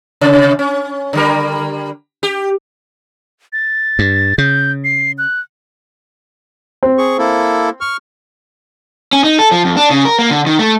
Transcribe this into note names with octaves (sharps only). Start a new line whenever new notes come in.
C3
C#4
D3 G3 A#4
G4
A6
G2
C#3 G6
C7
F#6
C4
G#4 C#6
A#3 E4 A4
C#6 F6
C#4
D#4
A4
F3
F2
D4
C#3
A#4
A#3
D3
D#3
A3